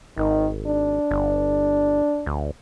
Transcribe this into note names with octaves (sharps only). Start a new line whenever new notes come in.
G#1 D#3
D4
G1
D2